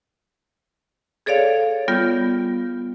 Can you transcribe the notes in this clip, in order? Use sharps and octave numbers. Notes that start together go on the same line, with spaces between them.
G#4 A4 C#5 D5 F5
G3 B3 F4 G6